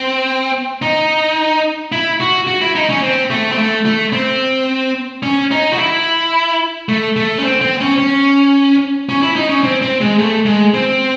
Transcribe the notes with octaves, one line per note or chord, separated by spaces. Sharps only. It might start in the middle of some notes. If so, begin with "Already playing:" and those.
Already playing: C4
D#4
E4
F#4
F#4
E4
D#4
C#4
C4
A3
C4
A3
A3
C4
C#4
D#4
F#4
E4
A3
A3
C#4
C4
C4
C#4
C#4
C#4
E4
D#4
C#4
C4
C4
G#3
A3
G#3
C4